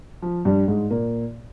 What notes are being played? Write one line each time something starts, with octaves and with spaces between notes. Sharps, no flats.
F3
G2 G3
G#2 G#3
A#2 A#3